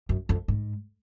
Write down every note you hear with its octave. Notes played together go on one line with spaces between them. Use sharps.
F#2
F2
G#2